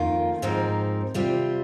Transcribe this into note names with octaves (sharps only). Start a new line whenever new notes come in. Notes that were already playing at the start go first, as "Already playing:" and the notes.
Already playing: F2 D#3 A#3 F4
G#2 F3 C4 D#4 A#4
C3 G3 C4 F4